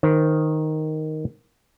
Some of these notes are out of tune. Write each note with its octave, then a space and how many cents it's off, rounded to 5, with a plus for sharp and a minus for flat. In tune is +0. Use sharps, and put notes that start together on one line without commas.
D#3 +0 C5 +0